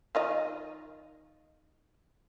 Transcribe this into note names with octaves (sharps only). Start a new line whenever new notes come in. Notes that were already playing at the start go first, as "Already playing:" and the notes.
D#3 F4 D#5